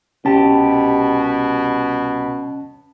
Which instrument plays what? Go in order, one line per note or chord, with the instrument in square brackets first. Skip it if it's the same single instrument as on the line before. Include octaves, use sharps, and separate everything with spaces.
[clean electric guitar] C2 G4 [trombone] B2 [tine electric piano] C#4 A5